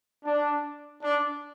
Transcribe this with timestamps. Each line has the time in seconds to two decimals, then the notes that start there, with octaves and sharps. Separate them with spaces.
0.25 D4
1.03 D4